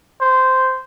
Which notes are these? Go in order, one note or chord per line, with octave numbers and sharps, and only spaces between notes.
C5